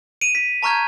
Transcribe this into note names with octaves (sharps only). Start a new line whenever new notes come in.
D7 D#7 F7
B6
A5 A#5 C#6 F6 G6 G#6